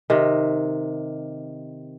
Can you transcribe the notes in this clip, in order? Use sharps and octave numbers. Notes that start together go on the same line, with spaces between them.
C3 D#3